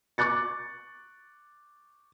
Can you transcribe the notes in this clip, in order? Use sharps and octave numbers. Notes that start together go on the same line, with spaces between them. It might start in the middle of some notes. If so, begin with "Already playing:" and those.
C#6 D6 F#6 A6 C#7